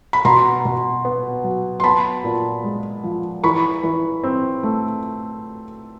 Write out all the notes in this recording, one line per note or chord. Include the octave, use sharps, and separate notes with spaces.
B5
B2 A#5 C6
B2
B3
F#3
C6
B3 A5 B5
A#2
G#3
F3
E3 B5 C#6
E3
C4
A3